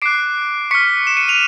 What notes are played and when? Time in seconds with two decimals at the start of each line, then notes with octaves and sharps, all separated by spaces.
0.02 D6 F#6 C7 D7
0.71 C#6 F6 B6 C#7
1.07 E7
1.17 C#7 D#7
1.28 D#7 F7